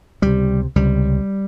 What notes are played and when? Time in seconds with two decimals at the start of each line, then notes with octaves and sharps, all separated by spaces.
0.22 C#2 C3 G3
0.76 C#2 C3 G3